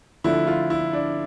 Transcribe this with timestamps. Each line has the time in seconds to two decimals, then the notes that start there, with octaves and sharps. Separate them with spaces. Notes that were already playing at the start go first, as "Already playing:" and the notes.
0.24 D3 F3 A3 E4
0.47 F4
0.70 E4
0.93 D4